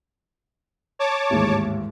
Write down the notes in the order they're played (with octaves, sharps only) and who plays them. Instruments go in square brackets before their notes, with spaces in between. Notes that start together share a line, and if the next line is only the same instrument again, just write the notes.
[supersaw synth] C#5 A5 D6
[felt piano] A1 D#2 G#2